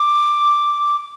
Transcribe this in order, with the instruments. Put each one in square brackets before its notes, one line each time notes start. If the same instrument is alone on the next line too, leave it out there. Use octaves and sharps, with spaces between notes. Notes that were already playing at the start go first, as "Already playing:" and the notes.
Already playing: [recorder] D6